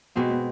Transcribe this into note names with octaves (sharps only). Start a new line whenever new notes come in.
B2 G#3 B3 C4
B3